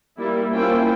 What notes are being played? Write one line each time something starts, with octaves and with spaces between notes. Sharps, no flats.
G3 A#3 E4
A#3 C#4 E4 F4 C5 G5